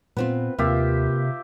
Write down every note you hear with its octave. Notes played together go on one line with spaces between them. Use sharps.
A#2 B3 C4 F4 B4
D#2 C3 A#3 F4 G4 E5